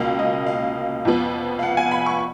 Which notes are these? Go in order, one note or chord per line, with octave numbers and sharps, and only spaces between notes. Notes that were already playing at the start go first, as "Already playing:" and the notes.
Already playing: C#2 B2 A#3 F5
D#5
F5
F2 F3 B3
F5
F#5
G#5
B5
C#6